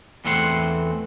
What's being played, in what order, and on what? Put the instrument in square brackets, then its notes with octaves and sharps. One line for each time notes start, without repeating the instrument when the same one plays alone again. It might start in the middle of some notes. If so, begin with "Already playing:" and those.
[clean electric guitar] E2 E3 A3 C4 F#5 C6